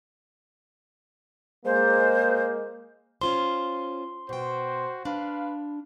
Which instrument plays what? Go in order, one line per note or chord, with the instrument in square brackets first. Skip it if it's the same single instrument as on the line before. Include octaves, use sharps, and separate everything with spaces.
[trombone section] G#3 A#3 [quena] C5
[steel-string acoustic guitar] C#4 F4 C5 [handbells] C6
[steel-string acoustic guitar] B2 G5 [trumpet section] F#4 C5
[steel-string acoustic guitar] D4 [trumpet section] B4 F5